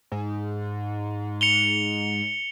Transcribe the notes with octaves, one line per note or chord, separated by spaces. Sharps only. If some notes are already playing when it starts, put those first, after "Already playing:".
G#2
C#7 F7 G7